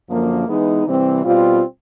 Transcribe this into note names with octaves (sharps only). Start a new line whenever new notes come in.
F#2 D3 F3 A#3
E3 G#3 B3 D#4
C3 E3 G3 C4
B2 G3 C4 F4